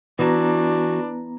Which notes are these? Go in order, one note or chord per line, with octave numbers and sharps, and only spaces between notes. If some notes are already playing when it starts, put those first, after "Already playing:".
E3 B3 D4 F#4 A#5